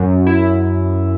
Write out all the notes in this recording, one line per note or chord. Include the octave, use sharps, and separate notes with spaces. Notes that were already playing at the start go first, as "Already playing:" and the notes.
Already playing: F#2
E4